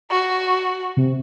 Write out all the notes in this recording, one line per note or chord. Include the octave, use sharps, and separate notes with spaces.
F#4
C3